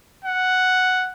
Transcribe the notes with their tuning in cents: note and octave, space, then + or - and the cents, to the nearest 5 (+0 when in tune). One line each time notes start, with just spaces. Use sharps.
F#5 +0